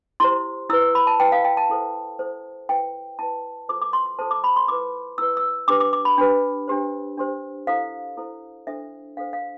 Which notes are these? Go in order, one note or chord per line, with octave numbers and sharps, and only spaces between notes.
E4 G4 C5 C6
E4 B4 E6
E6
B5
A5
E4 B4 G5
F5
G5
A5
E4 A4 C5
E4 A4 C5
E4 B4 G5
E4 B4 A5
F4 A4 C5 D6
D6
C6
C6
F4 A4 C5 A5
D6
B5
C6
E4 B4 D6
E4 B4 E6
E6
D4 G4 B4 D6
D6
D6
B5
D4 G4 B4
D4 G4 C5
D4 G4 C5
E4 A4 C5 F5
E4 A4 C5
D4 A4 C5 E5
D4 A4 C5 F5
F5